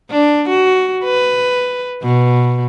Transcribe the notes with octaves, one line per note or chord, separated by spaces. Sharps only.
D4
F#4
B4
B2